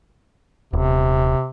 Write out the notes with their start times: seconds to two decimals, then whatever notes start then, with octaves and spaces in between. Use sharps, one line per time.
0.73 D#1 C3